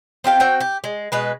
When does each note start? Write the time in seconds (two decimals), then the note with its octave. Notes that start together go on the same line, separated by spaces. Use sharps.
0.24 C4 F4 G4 F5
0.40 C4 F#4 G5
0.60 G4
0.84 G#3
1.12 B2 G#3 B4